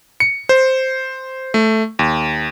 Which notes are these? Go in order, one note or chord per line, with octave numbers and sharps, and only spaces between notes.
C#7
C5
A3
D#2